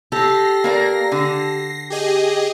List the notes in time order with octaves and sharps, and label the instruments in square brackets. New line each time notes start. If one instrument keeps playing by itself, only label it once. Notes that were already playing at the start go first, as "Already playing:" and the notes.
[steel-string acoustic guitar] G4 A4 [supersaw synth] A#6 C7
[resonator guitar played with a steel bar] A#3 A#4 D5
D3
[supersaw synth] G4 G#4 D#5